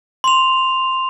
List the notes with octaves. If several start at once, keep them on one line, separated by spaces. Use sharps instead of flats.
C6 F7